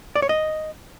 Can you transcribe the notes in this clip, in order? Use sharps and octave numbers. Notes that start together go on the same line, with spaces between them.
D5
C#5
D#5